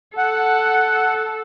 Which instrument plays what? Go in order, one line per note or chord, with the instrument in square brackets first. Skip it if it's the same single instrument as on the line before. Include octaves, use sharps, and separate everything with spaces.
[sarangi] A4 [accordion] F#5